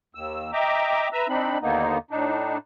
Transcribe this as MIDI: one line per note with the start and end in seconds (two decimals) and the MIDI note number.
0.15 0.51 39
0.15 0.51 88
0.53 1.09 75
0.53 1.09 76
0.53 1.09 79
0.53 1.09 82
0.53 1.09 86
1.12 1.27 71
1.12 1.27 76
1.12 1.27 82
1.12 1.27 88
1.29 1.58 60
1.29 1.58 62
1.29 1.58 63
1.29 1.58 83
1.62 1.98 39
1.62 1.98 50
1.62 1.98 58
1.62 1.98 59
1.62 1.98 63
2.11 2.58 45
2.11 2.58 62
2.11 2.58 63